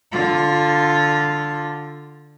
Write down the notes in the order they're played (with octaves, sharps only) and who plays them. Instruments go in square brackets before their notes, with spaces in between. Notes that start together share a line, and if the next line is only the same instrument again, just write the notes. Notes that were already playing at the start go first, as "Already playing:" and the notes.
[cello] D3 F4